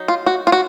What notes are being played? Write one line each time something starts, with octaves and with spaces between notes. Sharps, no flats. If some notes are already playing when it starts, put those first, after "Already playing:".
Already playing: F#3 D#4
F4
F#4
F4
F#4